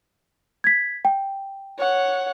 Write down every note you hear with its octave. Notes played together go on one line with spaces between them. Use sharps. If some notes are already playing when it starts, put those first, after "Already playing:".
G#6 B6
G5
C#5 F#5